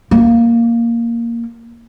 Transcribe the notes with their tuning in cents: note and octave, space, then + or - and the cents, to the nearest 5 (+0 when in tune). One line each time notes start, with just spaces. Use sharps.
A#3 +0